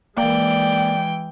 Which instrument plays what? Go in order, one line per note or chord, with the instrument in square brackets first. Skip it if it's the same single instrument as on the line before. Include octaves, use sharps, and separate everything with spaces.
[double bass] E3 G#3 [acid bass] A#3 [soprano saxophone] D5 [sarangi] G5